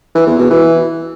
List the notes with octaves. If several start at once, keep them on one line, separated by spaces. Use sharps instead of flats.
E3
E2
B2
E3